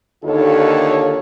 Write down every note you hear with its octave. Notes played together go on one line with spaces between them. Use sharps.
D#2 D3 D#4 F4 A4 C#5